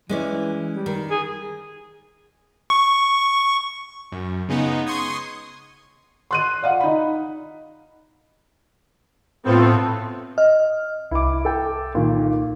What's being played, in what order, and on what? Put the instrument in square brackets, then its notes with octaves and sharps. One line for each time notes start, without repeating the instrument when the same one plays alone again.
[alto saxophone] E3 [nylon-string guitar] G#3 C#4 D5
[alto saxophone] G3
[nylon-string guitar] D#3
[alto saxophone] G#4
[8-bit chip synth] C#6
[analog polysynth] F#2
C#3 G#3 B3 D#4
C6 C#6 D#6 G#6
[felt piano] C6 F#6 D#7
D5 F5 F#5
D#4 B5
[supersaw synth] A2 A4 [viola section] B3 C4 F4
[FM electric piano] D#5 F6
[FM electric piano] C2 [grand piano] E4 D6
[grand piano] A4 G5
A#2 D#3